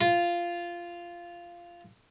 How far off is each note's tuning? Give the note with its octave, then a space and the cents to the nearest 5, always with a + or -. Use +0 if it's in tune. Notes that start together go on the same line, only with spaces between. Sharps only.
F4 -10